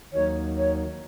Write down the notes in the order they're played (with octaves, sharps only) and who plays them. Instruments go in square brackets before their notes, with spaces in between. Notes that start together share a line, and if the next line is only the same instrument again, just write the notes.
[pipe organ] D#2 D#3 F#3 A#3 D#4 [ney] C#5
[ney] C#5